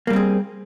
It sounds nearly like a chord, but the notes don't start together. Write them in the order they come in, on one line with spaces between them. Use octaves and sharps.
A#3 G3 C4 G#4